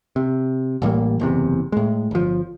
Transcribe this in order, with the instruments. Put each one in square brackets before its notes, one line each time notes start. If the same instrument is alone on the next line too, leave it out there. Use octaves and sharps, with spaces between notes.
[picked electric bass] C3
A1 A2 G3 A#3
F#1 E2 C3
A2 G#3
G1 F3